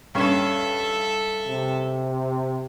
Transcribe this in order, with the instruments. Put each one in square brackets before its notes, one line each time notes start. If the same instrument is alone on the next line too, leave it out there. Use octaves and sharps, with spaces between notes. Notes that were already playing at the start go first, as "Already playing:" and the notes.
[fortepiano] G2 C#4 [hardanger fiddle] A4 E5
[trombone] C3